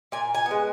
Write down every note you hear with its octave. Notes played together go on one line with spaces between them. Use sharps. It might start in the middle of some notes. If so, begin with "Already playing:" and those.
A#2 G#5
G#5
B3
G#3